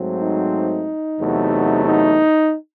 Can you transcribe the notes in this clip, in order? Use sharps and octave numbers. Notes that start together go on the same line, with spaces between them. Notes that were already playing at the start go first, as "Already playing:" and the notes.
Already playing: G#2 F#3 A3 C4
D#4
E2 C3 F#3 A3
D#4